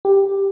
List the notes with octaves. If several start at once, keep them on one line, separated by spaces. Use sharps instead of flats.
G4